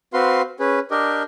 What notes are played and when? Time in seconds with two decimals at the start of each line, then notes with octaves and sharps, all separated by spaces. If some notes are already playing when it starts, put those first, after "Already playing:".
0.14 C4 F#4 B4 F5 C6
0.60 C#4 G#4 B4
0.91 D4 G4 A#4 D#5